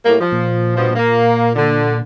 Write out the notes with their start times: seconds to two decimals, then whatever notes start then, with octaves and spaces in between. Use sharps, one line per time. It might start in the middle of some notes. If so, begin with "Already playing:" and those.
0.06 A2 G3 A#3
0.20 F3
0.32 A#2
0.76 G2 B2 F3
0.96 A#3
1.55 D3